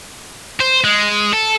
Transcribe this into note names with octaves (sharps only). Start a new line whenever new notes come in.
C5
G#3
A4